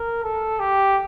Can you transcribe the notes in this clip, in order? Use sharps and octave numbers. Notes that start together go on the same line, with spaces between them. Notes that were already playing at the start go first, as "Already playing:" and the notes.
Already playing: A#4
A4
G4